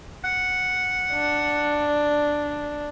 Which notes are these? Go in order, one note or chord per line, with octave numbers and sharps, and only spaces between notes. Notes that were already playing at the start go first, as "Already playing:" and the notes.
F#5
D4